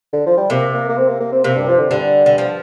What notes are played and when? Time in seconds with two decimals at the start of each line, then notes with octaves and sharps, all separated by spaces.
0.13 D3
0.26 F3
0.37 G3
0.50 C3 A#3
0.73 A#3
0.89 A#3
0.98 C4
1.08 A#3
1.20 A#3
1.32 C4
1.44 C3 A#3
1.56 G2
1.68 F3
1.79 D3
1.90 G2 D3
2.26 D3
2.38 F3